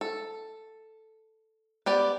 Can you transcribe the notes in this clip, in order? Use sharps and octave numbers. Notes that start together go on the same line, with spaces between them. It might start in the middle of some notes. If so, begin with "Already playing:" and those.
A4
B3 G4 D5